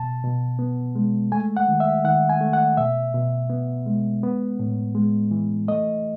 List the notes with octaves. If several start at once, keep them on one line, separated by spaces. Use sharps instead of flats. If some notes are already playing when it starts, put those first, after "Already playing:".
Already playing: B2 A5
B2
B3
G#3
A3 G#5
F#5
D#3
E5
D#3 F#5
G#5
A3
F#5
B2 E5
B2
B3
G#3
B3
A2
G#3
E3
A3 D#5